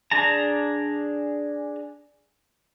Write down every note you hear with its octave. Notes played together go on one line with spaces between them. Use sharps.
D4 G#4 A5 A#5